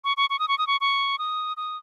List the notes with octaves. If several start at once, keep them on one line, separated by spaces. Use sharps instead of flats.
C#6
C#6
C#6
D#6
C#6
D#6
C#6
C#6
D#6
D#6